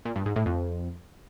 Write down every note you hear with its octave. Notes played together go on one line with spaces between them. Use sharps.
A#2
G2
G#2
A2
F2